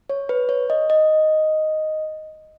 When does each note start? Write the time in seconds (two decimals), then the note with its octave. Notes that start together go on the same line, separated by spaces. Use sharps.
0.10 C#5
0.29 B4
0.49 C#5
0.70 D#5
0.90 D#5